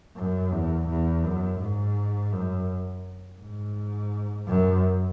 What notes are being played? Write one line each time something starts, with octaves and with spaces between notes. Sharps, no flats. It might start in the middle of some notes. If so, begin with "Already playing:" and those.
F#2
E2
E2
F#2
G#2
F#2
G#2
F#2